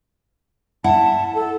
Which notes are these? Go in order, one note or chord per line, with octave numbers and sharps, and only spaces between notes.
E4 F#5 A5
A4